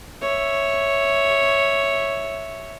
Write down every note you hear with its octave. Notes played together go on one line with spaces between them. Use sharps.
C#5 E5